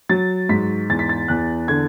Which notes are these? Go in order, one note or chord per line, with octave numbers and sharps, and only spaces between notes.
F#3 A6
G#2 B6
E2 A6
B6
A6
E2 F#6
D3 G#6